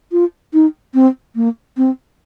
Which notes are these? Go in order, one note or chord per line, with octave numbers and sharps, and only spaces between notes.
F4
D#4
C4
A#3
C4